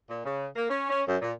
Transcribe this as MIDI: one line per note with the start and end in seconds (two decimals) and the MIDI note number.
0.09 0.21 46
0.25 0.46 49
0.56 0.65 58
0.69 0.85 61
0.89 1.00 61
1.06 1.16 42
1.21 1.32 46